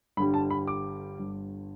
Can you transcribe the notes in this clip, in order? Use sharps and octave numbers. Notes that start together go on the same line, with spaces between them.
G1 G2 D3 G3 B5
A5
B5
D6
G1 G2 D3